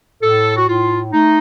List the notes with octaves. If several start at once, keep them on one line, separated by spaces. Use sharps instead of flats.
A2 A4
F#4
A2 F4
A3 D#4